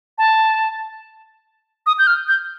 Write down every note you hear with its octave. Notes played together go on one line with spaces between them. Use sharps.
A5
D#6
G6
F6
G6